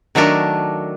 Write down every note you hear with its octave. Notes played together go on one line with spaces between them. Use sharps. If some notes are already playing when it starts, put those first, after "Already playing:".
D#3 F#3 A3 D4 A#4